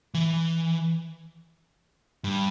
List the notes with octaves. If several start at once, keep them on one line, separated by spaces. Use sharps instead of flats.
E3
G2